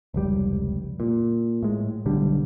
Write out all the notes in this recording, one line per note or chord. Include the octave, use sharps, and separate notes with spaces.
F1 C#2 G3
A#2
A2 G#3
B1 D3 G3